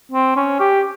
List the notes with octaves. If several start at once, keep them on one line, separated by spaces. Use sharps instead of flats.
C4
C#4
G4